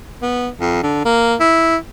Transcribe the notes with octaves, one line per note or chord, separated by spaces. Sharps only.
B3
F2
D3
A#3
E4